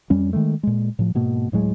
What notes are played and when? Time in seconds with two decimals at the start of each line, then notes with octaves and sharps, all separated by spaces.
0.10 F2 G3 C#4
0.33 D#3 G#3 A3
0.63 A#2 G#3
0.99 A2 F3
1.15 G#2 B2 A#3
1.52 D1 A2 F#3 G#3